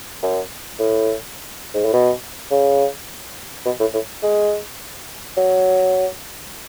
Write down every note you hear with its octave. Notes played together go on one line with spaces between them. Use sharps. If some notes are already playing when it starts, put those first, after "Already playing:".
F#2
A2
G#2
A2
B2
C#3
B2
A2
A2
G#3
F#3